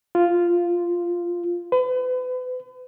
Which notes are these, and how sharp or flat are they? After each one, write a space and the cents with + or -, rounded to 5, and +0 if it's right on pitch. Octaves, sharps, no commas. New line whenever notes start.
F4 -5
B4 +35